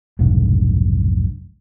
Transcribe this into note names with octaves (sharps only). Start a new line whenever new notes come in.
F1 B1 G#2 D3